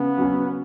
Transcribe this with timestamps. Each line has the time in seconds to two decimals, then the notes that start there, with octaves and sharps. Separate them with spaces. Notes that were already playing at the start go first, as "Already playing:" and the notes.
Already playing: C#3 B3
0.18 F#3 C#4